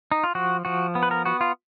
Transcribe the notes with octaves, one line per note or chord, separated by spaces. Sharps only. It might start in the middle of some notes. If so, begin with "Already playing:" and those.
D#4
F4
F3 F#4
F3 F#4
B3
B4
A#4
B3 F#4
F4